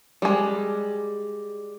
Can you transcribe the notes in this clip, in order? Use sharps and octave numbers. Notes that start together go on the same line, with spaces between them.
G3 G#3